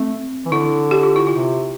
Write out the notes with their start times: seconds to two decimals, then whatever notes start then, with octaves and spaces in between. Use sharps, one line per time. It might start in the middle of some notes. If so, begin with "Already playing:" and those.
Already playing: A3 C4
0.46 E3
0.51 D3 E4
0.91 G4
1.03 F4
1.16 E4
1.27 C3 F4